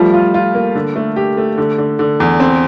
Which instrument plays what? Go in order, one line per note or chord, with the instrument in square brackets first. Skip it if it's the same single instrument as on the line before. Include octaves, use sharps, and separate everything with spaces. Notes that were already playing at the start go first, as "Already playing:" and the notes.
Already playing: [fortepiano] F3 [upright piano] G3 A3
[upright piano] F4
F4
A#3
D3
A3
G4
A3
D3
D3
D3
E2
C4